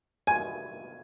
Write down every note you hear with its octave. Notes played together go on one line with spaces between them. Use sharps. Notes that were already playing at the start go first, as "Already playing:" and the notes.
G#5